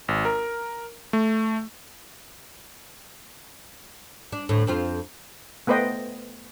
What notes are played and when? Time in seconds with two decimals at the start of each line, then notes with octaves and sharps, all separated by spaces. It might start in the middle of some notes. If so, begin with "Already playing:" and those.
0.08 G#1
0.25 A#4
1.13 A3
4.32 D4
4.49 D2 A2
4.67 F2 C4 F4
5.67 A3 B3 B4 C5 D#5 G5